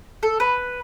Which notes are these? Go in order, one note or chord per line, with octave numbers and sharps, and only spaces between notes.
A4
B4